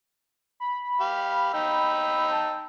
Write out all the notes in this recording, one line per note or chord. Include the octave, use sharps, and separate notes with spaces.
B5
G4 F5
D#4 G5 E6
A5